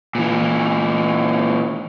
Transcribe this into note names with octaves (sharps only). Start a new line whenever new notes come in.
A#2 E3